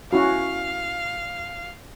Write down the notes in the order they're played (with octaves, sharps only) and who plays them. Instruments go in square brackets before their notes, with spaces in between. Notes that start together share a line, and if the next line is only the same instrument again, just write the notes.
[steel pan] C#4 E4 F#4 [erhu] F5